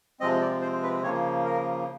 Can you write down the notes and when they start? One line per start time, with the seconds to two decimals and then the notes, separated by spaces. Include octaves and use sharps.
0.20 C3 F3 G#3 C4 D#5
0.41 D5
0.62 C5
0.83 B4
1.03 C#3 F3 A#3 C#5
1.45 A#4